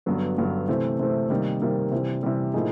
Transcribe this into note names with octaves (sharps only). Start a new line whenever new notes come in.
G2 D3 F#3 B3
G2 D3 F#3 B3
C3 E3 A3 C4
C3 E3 A3 C4
C3 D#3 G3 A#3
C3 D#3 G3 A#3
C3 E3 G3
C3 E3 G3
A2 F3 A#3 D#4 G#4